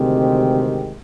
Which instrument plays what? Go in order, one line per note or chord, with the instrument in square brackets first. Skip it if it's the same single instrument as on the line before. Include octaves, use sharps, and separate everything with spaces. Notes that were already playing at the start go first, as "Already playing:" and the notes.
Already playing: [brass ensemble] D2 C3 D#3 G#3 C4 G4